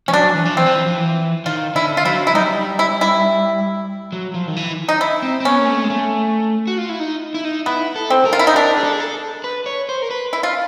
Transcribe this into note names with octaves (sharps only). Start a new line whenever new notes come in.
F3 C#4
F#3 D4
E3
F3
E3 C4
F3
E3
F3
E3
D#3 F4
D3 E4
F4
F#3 E4
E4
G3 D#4
E4
E4
F#3
F3
D#3
E3
D#4
E4
C4
C4
B3 C#4
A#3
A3
G#3
A3
F#4
F4
E4
D#4
E4
D#4
B3 E4
A4
C4
A#4
F4
E4
D#4
D4 A#4
G#4
A4
G#4
A4
B4
C#5
C5
A#4
B4
E4
F4